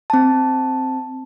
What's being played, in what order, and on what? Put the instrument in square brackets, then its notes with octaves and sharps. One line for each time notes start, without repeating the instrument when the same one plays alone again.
[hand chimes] C4 A5